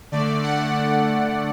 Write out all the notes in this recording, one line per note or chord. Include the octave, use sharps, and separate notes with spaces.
D3 A3 D5
F#5